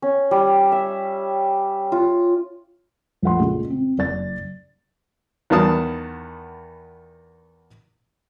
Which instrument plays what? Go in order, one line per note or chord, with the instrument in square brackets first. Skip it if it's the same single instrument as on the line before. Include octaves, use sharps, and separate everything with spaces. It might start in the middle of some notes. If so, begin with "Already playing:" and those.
[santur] C#4
G3
E5
F4
[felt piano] A#1 A3 F#5 C6
A#2 C#3 G#3
C4
F#1 D5 A6
[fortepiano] E2 D#3 B3 F5 A5 D#6